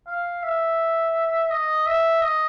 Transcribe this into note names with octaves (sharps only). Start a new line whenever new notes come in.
F5
E5
D#5
E5
D#5